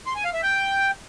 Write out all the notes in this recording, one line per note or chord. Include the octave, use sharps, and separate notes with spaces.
C6
G#5
F5
E5
G5